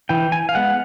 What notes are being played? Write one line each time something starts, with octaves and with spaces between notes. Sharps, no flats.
E3 G5
G#5
F5
G#3 B3 F#5